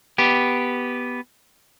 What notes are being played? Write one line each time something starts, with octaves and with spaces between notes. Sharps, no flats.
B3 G4